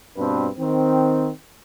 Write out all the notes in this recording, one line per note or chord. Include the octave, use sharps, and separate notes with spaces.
G2 B2 C4 D4 B4
D#3 C4